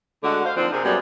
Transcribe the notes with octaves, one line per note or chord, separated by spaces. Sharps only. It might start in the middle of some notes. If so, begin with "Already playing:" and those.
D3 G#3 A3 F#4
C5 F5
F3 A#3 C4 D4 D#4
C3 C4 G#4 A#4
F#2 G3 B3 G#4 D5